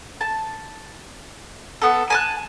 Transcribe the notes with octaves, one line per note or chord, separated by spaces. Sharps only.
A5
B3 A4
G#5 A5 F#6